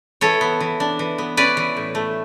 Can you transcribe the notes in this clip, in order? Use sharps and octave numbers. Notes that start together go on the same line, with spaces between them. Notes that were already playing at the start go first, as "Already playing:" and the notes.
E3 A4 C#5
B3
E3
D4
E3
B3
C#4 B4 D5
E3
A2
A3